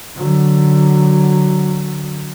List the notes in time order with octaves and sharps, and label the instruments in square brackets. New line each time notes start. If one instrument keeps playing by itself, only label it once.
[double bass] D3 F#3